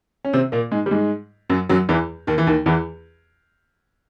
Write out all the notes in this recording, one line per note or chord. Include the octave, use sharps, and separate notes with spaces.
C#4
C3 C4
A#2 A#3
G#2 G#3
G3
G#2 G#3
F#2 F#3
F#2 F#3
E2 E3
D#2 D#3
E3
D#2 D#3
E2 E3